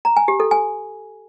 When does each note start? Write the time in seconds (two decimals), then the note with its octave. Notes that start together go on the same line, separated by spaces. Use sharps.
0.05 A#5
0.17 G#5
0.28 G4
0.40 A4
0.51 G#5